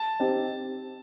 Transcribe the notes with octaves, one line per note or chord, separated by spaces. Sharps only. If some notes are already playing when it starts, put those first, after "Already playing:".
Already playing: A5
C4 D#4 G4